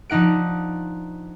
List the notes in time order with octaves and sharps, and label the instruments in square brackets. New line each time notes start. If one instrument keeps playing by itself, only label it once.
[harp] F3 D4 D#4 F#5 D7